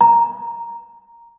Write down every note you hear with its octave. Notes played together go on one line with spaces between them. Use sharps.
A#5